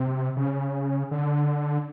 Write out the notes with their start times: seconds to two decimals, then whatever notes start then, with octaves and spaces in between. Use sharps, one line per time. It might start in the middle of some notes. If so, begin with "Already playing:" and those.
Already playing: C3
0.37 C#3
1.11 D3